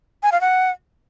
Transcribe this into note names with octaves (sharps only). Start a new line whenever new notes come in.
G#5
F5
F#5